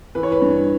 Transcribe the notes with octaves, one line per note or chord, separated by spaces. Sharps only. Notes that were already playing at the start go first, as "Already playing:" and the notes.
E3 B4
C#5
B4
G2